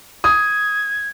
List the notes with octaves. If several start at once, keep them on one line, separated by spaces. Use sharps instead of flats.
D#6 G#6